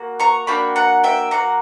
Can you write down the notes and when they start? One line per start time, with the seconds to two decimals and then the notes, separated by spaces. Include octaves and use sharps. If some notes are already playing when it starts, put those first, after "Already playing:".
Already playing: A#3 F#4
0.20 A#5 C#6
0.47 A#3 D4 F#4 G5 B5
0.76 F#5 A#5
1.04 E5 G5
1.31 A#3 D4 F#4 F#5 A#5